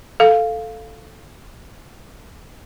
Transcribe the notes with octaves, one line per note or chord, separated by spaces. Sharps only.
A4 F5